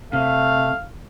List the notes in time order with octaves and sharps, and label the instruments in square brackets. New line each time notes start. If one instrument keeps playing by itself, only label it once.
[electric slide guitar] C3 [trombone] A3 [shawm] F5